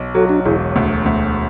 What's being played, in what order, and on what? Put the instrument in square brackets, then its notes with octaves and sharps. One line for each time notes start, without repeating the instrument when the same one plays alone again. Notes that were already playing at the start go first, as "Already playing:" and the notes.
Already playing: [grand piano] B1
[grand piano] F#3 [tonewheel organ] F#4 A4
[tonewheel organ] D4 F#4
[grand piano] E1 [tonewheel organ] E4 G#4
[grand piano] D2
D2